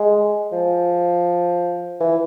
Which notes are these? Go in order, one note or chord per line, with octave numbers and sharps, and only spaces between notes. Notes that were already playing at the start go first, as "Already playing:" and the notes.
Already playing: G#3
F3
E3